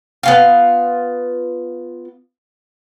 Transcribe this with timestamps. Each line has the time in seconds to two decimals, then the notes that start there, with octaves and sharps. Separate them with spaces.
0.23 B3 F4 F5